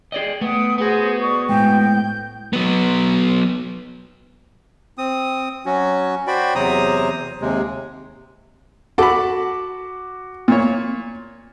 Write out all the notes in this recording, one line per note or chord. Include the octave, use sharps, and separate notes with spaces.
G#4 D5 D#5 G5
A3 B3 G5 D#6
B3 F#4 G#4 C5
D5 C#6 D#6
A2 G#3 G5 G6
F#3 B3
C4 D#6
F#3 C#4 F#4
F#4 C5 D5 G5 B5
E2 C3 F#3 C5 A#5 D#6
D#2 C3 G#3
F#4 A4 B5 D6
A#2 C#5